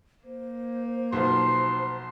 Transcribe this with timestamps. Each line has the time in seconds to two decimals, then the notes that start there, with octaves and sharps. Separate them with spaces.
0.24 A#3 C5
1.13 B1 F3 C6